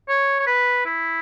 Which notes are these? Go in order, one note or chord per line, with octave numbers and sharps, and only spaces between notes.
C#5
C#5
B4
E4